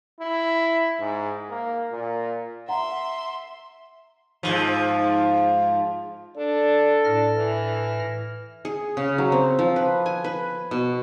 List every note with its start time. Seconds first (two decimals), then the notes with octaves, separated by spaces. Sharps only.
0.20 E4
1.00 G#2
1.50 A#3
1.92 A#2
2.69 E5 F#5 A#5 C6
4.43 G#2 B2 F3
6.37 D4 A4
7.05 A2 D4 F6 A#6
7.36 E3
8.65 G#4
8.97 C#3
9.18 F#3
9.32 C4
9.59 F3
9.76 B4
10.06 G#5
10.24 B4
10.71 B2